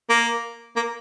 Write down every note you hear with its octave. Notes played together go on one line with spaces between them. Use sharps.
A#3
A#3